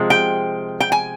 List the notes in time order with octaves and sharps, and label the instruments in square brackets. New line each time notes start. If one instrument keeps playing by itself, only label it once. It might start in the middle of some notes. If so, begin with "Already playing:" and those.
Already playing: [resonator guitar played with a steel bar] C3 F3 G#3
G5
G5
G#5